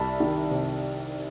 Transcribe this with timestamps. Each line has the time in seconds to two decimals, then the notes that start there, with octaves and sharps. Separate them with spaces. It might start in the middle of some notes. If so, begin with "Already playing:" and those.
Already playing: C2 A5 B5
0.20 D#3
0.51 C3